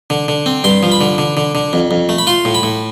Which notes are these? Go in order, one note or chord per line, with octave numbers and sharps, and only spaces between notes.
D3
D3
C4
G2 C6
F3
B5
D3
D3
D3
D3
F2
F2
A3
B5
F4 C6
A2
B5
A2